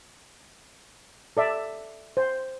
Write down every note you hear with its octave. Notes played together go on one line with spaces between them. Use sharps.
A4 D5 E5
C5